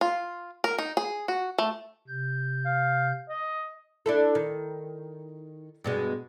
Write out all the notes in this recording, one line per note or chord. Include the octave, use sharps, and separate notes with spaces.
F4
A#4
D#4
G#4
F#4
A3
C3 G6
F5
D#5
D4 E4 A4
D#3
G2 B2 G#3